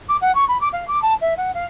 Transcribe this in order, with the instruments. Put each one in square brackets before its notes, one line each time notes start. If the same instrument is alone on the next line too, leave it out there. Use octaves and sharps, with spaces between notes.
[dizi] D6
F#5
C#6
B5
D6
F5
D6
A5
E5
F#5
F5